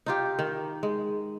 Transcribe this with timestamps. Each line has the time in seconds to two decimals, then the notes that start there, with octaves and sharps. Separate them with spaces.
0.06 D#4 F4 G4
0.39 D#3
0.83 G#3